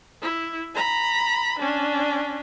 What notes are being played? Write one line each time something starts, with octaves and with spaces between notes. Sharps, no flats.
E4
A#5 B5
C#4 D4